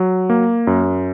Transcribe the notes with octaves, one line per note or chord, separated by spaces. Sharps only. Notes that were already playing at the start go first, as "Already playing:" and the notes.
Already playing: F#3
A#3
F#2